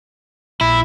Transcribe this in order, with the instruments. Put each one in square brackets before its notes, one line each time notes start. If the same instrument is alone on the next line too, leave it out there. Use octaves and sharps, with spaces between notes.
[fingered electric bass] A#1 [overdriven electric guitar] E4